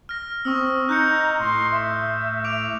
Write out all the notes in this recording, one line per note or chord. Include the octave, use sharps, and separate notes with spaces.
F6 A#6
C4 C#6 D#6 E6
D#4 A#5 F#6 G6 C#7
A2 C6
E5
D6 D7 F7